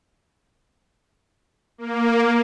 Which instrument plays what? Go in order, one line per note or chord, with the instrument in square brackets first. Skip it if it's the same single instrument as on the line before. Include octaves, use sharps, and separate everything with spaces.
[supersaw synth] A#3